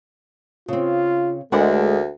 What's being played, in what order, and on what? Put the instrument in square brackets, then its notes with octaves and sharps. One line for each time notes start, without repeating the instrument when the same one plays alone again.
[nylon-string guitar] C#3 C4 [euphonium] F4
[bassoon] D2 [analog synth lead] G#3 [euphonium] A3 [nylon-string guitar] D4 A#4 F#5